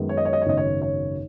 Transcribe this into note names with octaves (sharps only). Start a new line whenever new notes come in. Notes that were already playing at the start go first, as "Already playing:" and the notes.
Already playing: F#2 D#3 G#3 B3
C#5
D#5
C#5
D#5
C#5
G#1 F#2 C#3 B3 D#5
C#5
C#5